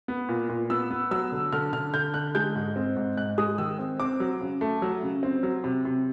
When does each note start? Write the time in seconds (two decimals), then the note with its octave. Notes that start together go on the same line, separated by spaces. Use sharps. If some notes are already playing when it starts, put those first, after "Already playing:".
0.08 B3
0.29 A#2
0.49 A#2
0.70 B3 E6
0.91 B3
1.11 F#3 E6
1.32 D3
1.52 D3 F6
1.73 D3 F6
1.94 D3 G6
2.14 D3 F#6
2.35 G#3 G6
2.55 G#2
2.76 C4
2.96 G#2
3.17 G#2 F#6
3.38 G#3 D#6
3.58 D#3 E6
3.79 C4
4.00 C4 D6
4.20 F#3
4.41 C#3
4.61 A3
4.82 F#3
5.03 C#3
5.23 C4
5.43 F#3
5.64 C3
5.85 C3